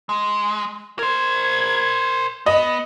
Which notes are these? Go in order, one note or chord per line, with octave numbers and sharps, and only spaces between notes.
G#3
A#4 C5 G#6
B3 D#5